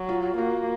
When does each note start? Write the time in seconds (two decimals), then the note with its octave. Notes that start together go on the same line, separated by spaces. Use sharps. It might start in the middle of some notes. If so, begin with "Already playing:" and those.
Already playing: F#3
0.09 F4
0.37 A#3 F#4